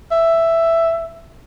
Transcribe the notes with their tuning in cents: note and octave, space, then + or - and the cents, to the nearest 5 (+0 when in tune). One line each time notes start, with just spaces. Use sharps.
E5 +5